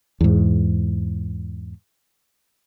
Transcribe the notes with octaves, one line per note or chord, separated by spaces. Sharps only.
E2 G#2